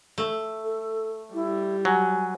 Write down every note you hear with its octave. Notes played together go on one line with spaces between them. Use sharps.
A3
A4
G3 E4
F#3 G#5